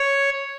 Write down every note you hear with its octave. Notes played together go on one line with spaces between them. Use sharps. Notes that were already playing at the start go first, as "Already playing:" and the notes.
Already playing: C#5